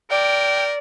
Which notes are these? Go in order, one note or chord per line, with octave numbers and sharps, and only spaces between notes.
A#4 D5 G5